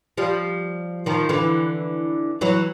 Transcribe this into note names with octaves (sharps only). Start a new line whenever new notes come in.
F3 G3
D#3 F3
D3 E3
E3 F#3